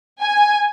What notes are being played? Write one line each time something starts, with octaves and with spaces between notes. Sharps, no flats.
G#5